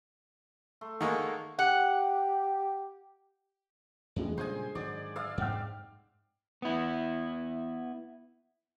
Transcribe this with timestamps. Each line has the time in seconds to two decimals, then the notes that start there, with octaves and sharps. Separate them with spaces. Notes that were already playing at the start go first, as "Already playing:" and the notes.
0.81 A3 A#5 C6
1.01 D#3 G#3 A#3 F#5 C#6
1.59 G4 F#5
4.16 E2 A2 D3 E3 G#3
4.38 A#2 C#3 G3 C5 D#5 G#5
4.75 G#2 D#3 F#3 D5
5.16 D5 E5 F5
5.38 F2 G#2 F#5 G5 F6
6.62 B3 E4